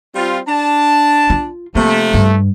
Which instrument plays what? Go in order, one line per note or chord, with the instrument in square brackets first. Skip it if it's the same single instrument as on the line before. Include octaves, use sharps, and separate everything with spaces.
[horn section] G3 C4 F4
D4 A5
[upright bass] F4
[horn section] C3 F3 A3 [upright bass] A#3
[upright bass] G2